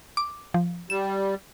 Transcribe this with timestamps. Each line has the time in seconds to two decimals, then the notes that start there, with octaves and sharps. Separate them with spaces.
0.17 D6
0.54 F3
0.90 G3 E7